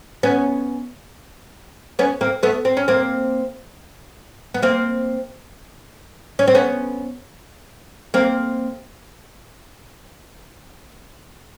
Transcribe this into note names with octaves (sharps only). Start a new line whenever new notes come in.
B3 C#4
B3 C#4
A#3 C4
A3 B3
C4
C#4
A#3 C4
B3
A#3 C4
C#4
C4
B3 C#4
A#3 C4